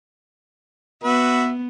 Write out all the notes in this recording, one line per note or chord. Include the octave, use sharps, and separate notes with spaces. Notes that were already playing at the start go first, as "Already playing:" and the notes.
B3 F#4 B4 E5